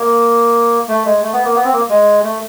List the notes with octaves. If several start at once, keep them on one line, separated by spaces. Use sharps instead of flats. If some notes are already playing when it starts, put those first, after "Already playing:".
Already playing: A#3
A3
G#3
A3
B3
A#3
B3
C4
A#3
G#3
A3